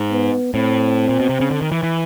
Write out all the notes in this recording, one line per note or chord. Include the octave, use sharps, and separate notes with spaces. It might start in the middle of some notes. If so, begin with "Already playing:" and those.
Already playing: G#2
B3
A2 C4
A#2
B2
C3
C#3
D3
D#3
E3
E3